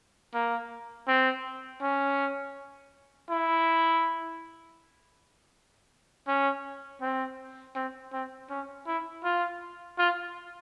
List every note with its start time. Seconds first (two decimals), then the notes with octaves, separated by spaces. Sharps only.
0.34 A#3
1.08 C4
1.82 C#4
3.30 E4
6.27 C#4
7.02 C4
7.76 C4
8.13 C4
8.50 C#4
8.87 E4
9.24 F4
9.99 F4